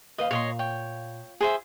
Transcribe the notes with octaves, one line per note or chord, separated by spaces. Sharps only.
D#2 B4 D#5 F5
A#2 C#5 D#5 C6
C#5 G5
G#4 C5 E5